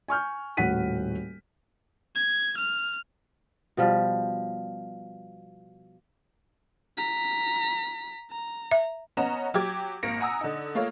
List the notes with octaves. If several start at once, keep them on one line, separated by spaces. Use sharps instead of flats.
G#5 C#6 F6 G6
D#1 A2 F#4 F#5 B6 D#7
G#6
F6
B2 F3 G3
A#5 B6
A#5
E5
B3 C#4 D#5 F#5 A#5 E7
F#3 G4 D6 G#6
G#1 A#3 A#6 C#7 D7
F#5 G#5 A#5 D#6 E6
D3 D#4
A3 A#3 F4 C#5